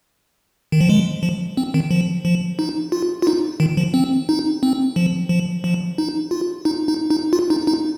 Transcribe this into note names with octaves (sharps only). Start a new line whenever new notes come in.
D#3
F3
G#3
F3
C4
D#3
F3
F3
D#4
F4
F4
D#4
D#3
F3
C4
D#4
C4
F3
F3
F3
D#4
F4
D#4
D#4
D#4
F4
D#4
D#4